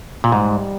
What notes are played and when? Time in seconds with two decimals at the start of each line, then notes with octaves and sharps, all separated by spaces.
0.24 A#2
0.32 G#2 G3